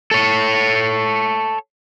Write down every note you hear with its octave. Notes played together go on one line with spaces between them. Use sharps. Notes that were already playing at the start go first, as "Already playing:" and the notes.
A4 C#5